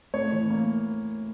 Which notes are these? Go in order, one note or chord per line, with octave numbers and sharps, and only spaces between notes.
A2 C#5
E3
A#3